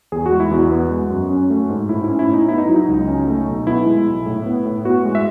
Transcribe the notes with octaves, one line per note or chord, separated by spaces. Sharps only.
E2 G#4
F#4
G#3
E4
E2 F#4
B3
G#3
F#2
C#4
A3
G#2
A2 E4
E4
C#4
E4
A2
D#4
B3 E4
D#4
F#3
D#4
C#2
C#4
A3
B1
B3 E4
G#3
B1
A2
B3
A2
B3 F#4
G#3
E5